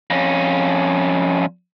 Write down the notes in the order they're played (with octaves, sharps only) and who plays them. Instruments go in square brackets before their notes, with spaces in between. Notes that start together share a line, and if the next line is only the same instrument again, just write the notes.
[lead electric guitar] F2 C#4